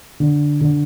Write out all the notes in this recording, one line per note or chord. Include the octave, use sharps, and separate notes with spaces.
D3
D3